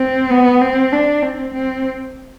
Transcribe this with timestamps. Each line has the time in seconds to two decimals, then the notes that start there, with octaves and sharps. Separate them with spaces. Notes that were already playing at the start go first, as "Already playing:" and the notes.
Already playing: C4
0.31 B3
0.62 C4
0.92 D4
1.22 C4
1.54 C4